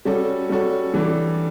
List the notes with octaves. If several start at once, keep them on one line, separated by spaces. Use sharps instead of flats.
G3 C#4 F#4 A4
G3 C#4 F#4 A4
E3 G3 D4 A4